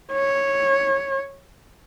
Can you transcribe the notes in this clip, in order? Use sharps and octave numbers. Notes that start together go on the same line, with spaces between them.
C#5